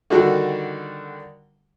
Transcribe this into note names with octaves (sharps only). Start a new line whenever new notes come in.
D3 D#3 G3 D4 F#4 A4